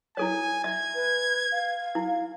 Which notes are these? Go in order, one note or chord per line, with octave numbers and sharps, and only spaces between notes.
E4 A4 C#5 G#5
E5 G#6
B4
F5
E4